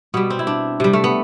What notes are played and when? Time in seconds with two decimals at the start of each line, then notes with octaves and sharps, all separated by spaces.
0.14 B2 G3 B3
0.30 C4
0.39 E4
0.47 D4
0.80 C3 G3
0.93 A3
1.04 B3